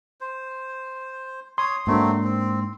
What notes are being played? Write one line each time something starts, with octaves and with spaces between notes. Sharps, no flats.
C5
C#5 C6 D#6
G#2 F#3 A3 A#3 C4 D4
C4